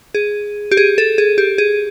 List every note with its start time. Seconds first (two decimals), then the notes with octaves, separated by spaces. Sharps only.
0.15 G#4
0.71 G4
0.77 G#4
0.98 A4
1.18 G#4
1.38 G4
1.58 G#4